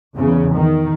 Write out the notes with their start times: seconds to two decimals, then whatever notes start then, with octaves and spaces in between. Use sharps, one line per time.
0.15 E2 C#3
0.55 D#3